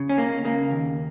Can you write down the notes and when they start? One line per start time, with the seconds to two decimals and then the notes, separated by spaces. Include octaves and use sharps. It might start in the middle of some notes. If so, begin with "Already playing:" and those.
Already playing: C#3
0.09 C#4
0.18 C#2 A#3
0.45 C#3 A#3
0.71 D#2